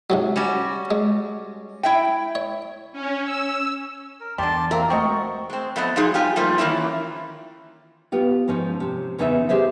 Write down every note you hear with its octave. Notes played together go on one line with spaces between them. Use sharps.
G#2 C3 F#3
G3 C#4 F#4
G#3
E4 E5 G5
C#5
C#4
E6
A#4
E2 D3 G3 D5 A5 C6
A#3 C4 A#4 E5
G#3 A3 C4 F#4 D#5 C#6
G#3 C4
F2 A3 B3 D#5
F3 F#3 G#3 D#4 G#4
G2 F4 G4 G#5
F3 G3 A3 A#3 D#4 F4
D#3 E3 A#3 C#4 E4
B3 F4 G4
G#2 F3 C#4 D#4
C3
E2 C#3 B3 D#4 A4 E5
G4 G#4 C5 E5